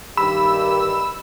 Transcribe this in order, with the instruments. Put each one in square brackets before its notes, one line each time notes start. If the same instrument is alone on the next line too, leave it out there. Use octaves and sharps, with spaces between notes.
[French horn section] G2 D#3 G4 [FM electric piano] B5 [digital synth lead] E6